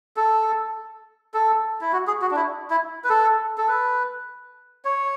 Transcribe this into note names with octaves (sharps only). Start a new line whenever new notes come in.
A4
A4
E4
F#4
G#4
F#4
D4
E4
E4
B4
A4
A4
B4
C#5